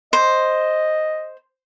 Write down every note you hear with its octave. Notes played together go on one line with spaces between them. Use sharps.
C5 D#5